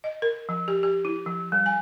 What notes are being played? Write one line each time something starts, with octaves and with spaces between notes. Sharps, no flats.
D#5
A#4
F3
G4
G4
E4
F3
G3
G#5